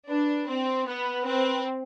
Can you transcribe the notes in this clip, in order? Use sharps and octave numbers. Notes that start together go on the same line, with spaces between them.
D4 B4
C4 C5
B3 B4
C4 B4